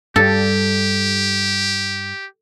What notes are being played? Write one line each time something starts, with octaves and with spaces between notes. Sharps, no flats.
G2 G3 G4 A4